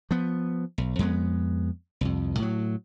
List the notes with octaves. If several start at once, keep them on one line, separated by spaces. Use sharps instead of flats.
F3 B3
B1
F2 G#3 B3
C2 F2
A2 F#3